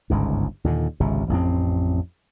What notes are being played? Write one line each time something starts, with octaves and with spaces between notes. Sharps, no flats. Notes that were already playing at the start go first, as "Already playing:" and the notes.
G1 C#2 G#2
D#2 A#2 D3
G#1 C#2 C3
A1 F2 C4